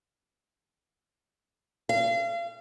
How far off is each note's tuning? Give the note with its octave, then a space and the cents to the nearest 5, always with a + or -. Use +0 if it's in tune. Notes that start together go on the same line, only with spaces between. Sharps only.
F5 -35